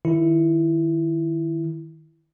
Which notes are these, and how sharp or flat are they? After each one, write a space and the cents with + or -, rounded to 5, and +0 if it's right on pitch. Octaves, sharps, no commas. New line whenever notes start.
D#3 -5 E4 +10